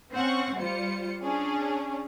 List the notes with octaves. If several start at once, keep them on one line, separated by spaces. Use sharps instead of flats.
C4 C#4 F#5 C#6
G3 F4 C5 C#7
C#4 D4 G#4